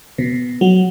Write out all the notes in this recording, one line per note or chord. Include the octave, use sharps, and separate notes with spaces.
B2
F#3